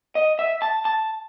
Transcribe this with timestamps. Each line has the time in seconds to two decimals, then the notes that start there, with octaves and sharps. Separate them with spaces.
0.15 D#5
0.39 E5
0.62 A5
0.85 A5